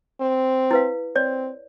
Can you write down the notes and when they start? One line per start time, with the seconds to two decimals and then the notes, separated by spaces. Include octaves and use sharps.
0.20 C4
0.71 E4 B4 F5
1.15 C4 C#5 D5